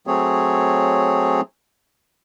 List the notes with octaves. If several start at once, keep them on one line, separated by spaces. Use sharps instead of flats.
F#3 A3 C4 G#4 C#5